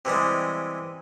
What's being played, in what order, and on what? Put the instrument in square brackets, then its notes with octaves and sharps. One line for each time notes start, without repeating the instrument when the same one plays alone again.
[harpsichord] C3 E3 G3 G#3